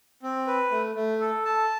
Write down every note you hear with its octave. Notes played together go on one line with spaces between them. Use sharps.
C4
B4
A3
A3
A4
A5